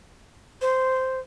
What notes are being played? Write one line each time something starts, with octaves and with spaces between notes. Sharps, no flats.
C5